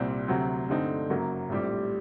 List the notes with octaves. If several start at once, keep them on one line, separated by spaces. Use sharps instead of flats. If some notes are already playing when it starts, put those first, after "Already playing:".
Already playing: C2 A#2 G3 C4
D2 C3 F#3 C4
G2 D3 A3 C4 D#4
F#1 F#2 F#3 A#3
A#1 A2 G3 C4 G4